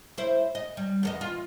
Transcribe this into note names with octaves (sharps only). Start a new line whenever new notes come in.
E4 C5
D#5
G3
E2 A4 D#5
F4